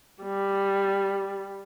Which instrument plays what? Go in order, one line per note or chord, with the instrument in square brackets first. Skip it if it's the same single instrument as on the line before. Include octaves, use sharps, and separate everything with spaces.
[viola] G3